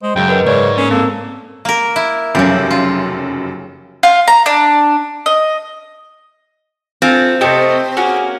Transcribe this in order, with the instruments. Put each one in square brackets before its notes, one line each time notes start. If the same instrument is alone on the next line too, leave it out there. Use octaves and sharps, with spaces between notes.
[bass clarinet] G#3 [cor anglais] C5
[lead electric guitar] F#2 [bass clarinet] C#3 [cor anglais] G5
[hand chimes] A#4 B4 D#5
[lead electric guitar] G#2 [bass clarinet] C#3 [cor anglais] C#5 [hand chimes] D5
[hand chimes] A#3 A#4 [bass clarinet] C#4
[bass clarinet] A#3 [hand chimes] C4 [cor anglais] A4
[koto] A#3 A#4
E4
[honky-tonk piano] F1 F#2 [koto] C#3 G4
[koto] F4
[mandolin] F4
A#5
D4
D#5
[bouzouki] A3 F4 G#5 [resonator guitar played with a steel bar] C4 [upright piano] F5
[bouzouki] C3 F3 A3 [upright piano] G4 C5 [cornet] D#5
[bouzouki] A#3 C#4 A#4 [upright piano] F#4 F#5 G#5 [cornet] G#4